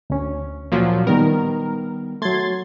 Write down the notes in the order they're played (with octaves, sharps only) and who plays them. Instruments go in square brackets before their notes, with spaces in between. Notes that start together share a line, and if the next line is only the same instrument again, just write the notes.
[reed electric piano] D2 C#4
[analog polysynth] A#2 F3 F#3
[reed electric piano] D#3 G3 B3 [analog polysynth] A#4
[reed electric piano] F#3 A3 [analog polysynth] C6 G#6 A6